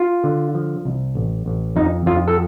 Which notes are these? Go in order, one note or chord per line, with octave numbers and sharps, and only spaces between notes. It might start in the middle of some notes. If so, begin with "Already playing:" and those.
Already playing: F4
D3
F3
C2
A1
A1
F2 D#4
F2 F4
A4